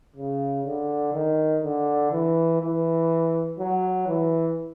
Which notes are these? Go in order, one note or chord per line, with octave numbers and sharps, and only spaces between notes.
C#3
D3
D#3
D3
E3
E3
F#3
E3